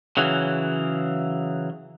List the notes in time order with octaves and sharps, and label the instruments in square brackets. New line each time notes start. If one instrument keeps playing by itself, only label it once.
[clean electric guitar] C#3 E3 F#3